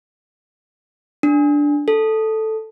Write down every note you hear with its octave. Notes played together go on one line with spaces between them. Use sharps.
D4
A4